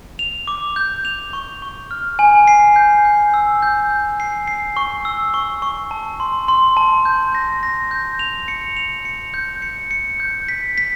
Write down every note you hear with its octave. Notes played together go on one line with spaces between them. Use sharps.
F7
D6
G6
F7
C#6
C#6
F6
G#5
C7
G6
G6
E6
G6
G6
C7
C7
C#6
E6
C#6
C#6
A5
C6
C6
A5
G6
A#6
A#6
G6
F7
C#7
F7
C#7
G6
C#7
C#7
G6
B6
B6